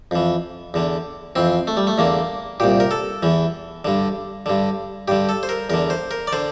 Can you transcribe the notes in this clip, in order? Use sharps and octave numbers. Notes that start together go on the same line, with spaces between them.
F2 E3
E2 D3
F2 E3 C4
A3
G3
A3
E2 D3 A#3
C2 A#2 G4
A#4
A4
E2 E3
G2 D3
G2 D3
G2 D3 G4
A4
C5
A#4
E2 D3 A#4
C5
A#4
D5
D3 C5